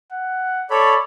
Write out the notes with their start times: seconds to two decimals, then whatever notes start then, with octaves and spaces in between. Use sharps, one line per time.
0.12 F#5
0.70 A4 C#5 D5 B5